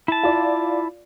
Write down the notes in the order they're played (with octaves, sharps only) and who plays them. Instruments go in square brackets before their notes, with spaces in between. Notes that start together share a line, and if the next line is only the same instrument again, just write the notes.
[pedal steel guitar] E4 A5
[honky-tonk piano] F4 D5